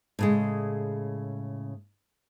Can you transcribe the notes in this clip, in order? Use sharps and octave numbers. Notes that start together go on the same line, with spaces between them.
A2 C#3 G#3